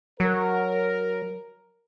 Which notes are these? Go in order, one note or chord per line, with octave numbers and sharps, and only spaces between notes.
F#3 A#4